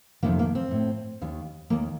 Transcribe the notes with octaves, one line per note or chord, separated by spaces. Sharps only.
F2 C3 D#3 A#3
A#3
C4
A2
D#2 D#3
D#2 D#3 A#3